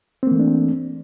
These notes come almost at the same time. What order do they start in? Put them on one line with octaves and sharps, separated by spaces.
C4 A#3 E3 A3 D4